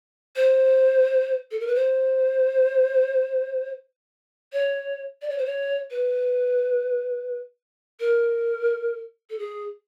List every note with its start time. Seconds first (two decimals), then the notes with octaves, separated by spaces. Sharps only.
0.36 C5
1.51 A4
1.60 A#4
1.67 B4
1.75 C5
4.53 C#5
5.22 D5
5.30 C#5
5.38 C5
5.45 C#5
5.91 B4
8.00 A#4
9.30 A4
9.39 G#4